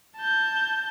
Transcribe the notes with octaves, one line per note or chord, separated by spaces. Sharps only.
A5 G6